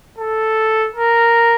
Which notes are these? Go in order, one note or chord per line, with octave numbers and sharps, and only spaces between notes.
A4
A#4